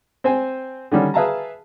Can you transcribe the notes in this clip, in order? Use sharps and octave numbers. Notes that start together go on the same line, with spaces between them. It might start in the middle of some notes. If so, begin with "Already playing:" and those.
C4 C5 G5 G#5
D3 D#3 G3 C#4
G#4 B4 E5 F5 A5 A#5